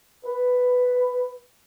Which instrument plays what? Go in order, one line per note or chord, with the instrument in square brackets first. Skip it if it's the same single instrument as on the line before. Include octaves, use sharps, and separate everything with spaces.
[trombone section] B4